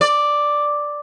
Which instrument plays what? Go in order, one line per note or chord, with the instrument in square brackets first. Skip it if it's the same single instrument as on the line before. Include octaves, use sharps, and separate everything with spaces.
[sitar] D5